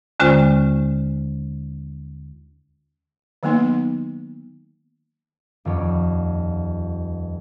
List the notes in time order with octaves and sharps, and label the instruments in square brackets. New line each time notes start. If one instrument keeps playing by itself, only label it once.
[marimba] D#2 D3 G#3 C#4 F4 C5
[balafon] D#3 F#3 A#3 B3 D#4
[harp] D#1 F2 C#5